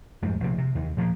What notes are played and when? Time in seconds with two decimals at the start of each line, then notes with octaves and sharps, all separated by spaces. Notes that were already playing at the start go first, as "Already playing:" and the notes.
0.22 F2 G#2 G3
0.40 A#1 C3
0.58 C3
0.75 D#2
0.97 A#2 F3 G#3 A#3